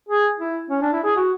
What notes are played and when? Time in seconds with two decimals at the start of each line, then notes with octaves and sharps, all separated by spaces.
0.09 G#4
0.39 E4
0.70 C#4
0.82 D4
0.93 E4
1.04 G#4
1.16 F#4